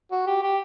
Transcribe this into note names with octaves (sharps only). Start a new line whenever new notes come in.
F#4
G4
G4